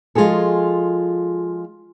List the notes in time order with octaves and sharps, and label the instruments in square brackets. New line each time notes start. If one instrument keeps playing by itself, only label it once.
[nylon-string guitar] F3 G#3 F4 F#4 G#4 A4